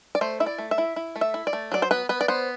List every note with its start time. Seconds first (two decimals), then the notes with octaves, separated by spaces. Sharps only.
0.15 D5
0.21 A3 C5
0.40 E4 E5
0.46 D5
0.58 A3
0.71 E5
0.78 E4
0.96 E4
1.16 A3
1.21 E5
1.34 E4
1.47 D5
1.53 A3
1.72 F#3 D5
1.82 C5
1.91 B3 B4
2.09 B3 B4
2.21 D5
2.28 B3 C5